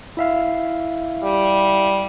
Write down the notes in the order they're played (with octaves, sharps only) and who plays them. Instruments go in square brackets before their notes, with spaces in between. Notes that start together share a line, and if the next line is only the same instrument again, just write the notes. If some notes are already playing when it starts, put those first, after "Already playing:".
[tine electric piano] E4 E5 F5
[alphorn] G3